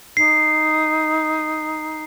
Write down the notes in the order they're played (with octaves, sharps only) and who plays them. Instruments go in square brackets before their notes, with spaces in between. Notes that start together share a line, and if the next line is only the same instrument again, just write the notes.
[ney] D#4 [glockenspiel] C7